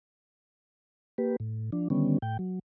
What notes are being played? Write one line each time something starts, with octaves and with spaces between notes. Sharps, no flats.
A#3 G4 B4
A2
F3 D4
D3 D#3 G3 B3 C#4
A2 G5
F#3